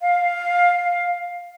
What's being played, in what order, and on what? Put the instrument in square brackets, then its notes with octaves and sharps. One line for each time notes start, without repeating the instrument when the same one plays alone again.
[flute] F5